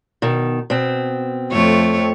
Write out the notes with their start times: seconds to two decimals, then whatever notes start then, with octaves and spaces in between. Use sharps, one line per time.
0.22 B2 D#3
0.70 B2 C4
1.52 F2 A3 C#5